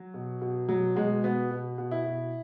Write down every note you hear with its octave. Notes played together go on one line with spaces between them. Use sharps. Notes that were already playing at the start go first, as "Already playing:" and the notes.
Already playing: F#3
B2
B2
B2 F#3
B2 G#3
B2 B3
B2
B2
E4
B2